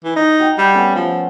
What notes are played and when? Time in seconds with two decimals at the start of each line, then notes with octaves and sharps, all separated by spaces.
0.04 E3
0.16 D#4
0.39 F#4 G5
0.58 G3
0.74 A3 B3 C#4
0.96 F3